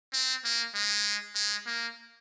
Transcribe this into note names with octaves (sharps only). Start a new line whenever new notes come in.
C4
A#3
G#3
G#3
A#3